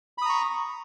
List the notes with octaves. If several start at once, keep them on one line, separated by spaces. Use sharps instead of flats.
A#5 B5 C#6 D#6